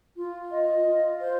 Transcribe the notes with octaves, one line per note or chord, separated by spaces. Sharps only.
F4
D#5
F4
C5